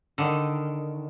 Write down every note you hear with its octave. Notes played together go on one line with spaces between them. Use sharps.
D3 D#3